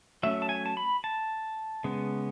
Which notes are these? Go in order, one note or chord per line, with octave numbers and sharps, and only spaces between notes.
F#3 A3 C#4 E5
A5
G#5
A5
B5
A5
C#3 G#3 B3